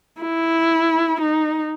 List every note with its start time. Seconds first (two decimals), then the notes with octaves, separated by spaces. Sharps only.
0.22 E4
1.21 D#4